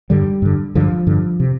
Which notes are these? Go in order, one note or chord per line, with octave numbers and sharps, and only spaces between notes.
G2 D3 G3
G2 D3
G2 D3 F3
G2 D3
C3